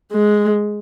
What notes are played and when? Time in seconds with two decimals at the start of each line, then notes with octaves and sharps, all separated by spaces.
0.12 G#3